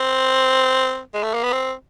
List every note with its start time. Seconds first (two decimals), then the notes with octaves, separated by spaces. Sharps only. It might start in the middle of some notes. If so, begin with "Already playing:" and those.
Already playing: C4
1.14 G#3
1.24 A3
1.34 A#3
1.44 B3
1.52 C4